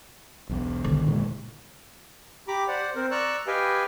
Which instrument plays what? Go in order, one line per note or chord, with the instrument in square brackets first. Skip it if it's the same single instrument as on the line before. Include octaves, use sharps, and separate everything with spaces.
[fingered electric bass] B1 E2
[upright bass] D3 D#3
[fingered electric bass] G1 A#2 G#3
[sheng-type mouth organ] G4 A#5 B5 D6
C5 D5 F#5
C4 A#4 C5
D5 A#5 C#6 E6 F#6
G4 B4 D#5 F5 G5 G#5